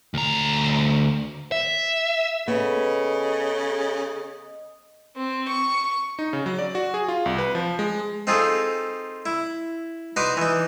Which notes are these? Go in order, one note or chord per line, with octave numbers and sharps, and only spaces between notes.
D2 A#5
E5
C#3 B3 A4 D#5
C4
C#6
D#4
C#3
F#3
D5
F#4
G#4
F4
C2
B4
F3
G#3
C4 D#4 F4 G#4 A4
E4
D#4 F#4 B4 C6 D6
E3 D#4